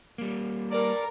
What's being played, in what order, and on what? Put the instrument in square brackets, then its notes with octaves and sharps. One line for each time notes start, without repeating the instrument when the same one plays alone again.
[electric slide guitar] G3 A#3
[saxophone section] G2 D5 [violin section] A#4